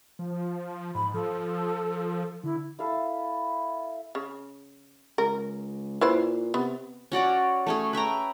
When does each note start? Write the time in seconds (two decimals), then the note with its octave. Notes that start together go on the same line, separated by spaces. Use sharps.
0.19 F3
0.95 G#2 B5
1.14 F3 A4
2.44 D3 E4
2.79 E4 A4 F5
4.15 C#3
5.18 C#2 A#4
6.01 A#2 E4 B4 C5
6.54 C3 B3
7.12 C#4 F#4 D5 F#5
7.67 A3 C#4 G#4
7.93 B4 E5 G5 A#5